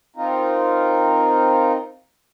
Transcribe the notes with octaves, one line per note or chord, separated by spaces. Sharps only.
C4 D#4 F4 A#4